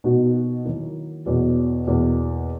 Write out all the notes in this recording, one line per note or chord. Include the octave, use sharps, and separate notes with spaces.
B2 A#3 D#4 F#4
D#3 F#3 A#3 E4
E2 B2 F#3
E2 B2 A#3